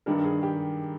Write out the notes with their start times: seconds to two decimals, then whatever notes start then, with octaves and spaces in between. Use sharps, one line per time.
0.06 G2 D#3 G3 D4 A#4
0.24 G#4
0.43 G4